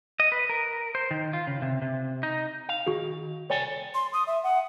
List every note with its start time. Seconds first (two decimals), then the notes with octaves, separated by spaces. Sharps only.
0.20 D#5
0.32 B4
0.49 A#4
0.95 C5
1.11 D#3
1.33 F4
1.47 C#3
1.62 C3
1.82 C3
2.23 D#4
2.69 F5
2.87 D#3 F#4 G#4
3.50 C2 A4 C#5 D5 G5 G#5
3.94 C6
4.13 D#6
4.27 E5
4.43 F#5